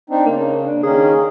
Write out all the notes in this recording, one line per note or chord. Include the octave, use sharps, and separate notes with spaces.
C4 D4 D#4
C#3 A#3
D4
D#3 A#3 C#4 G#4